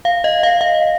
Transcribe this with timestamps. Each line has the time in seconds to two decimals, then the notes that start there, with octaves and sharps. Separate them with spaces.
0.05 F5
0.24 D#5
0.43 F5
0.61 F5